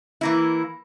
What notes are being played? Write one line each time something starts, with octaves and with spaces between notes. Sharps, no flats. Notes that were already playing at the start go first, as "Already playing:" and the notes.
E3 A#3 E4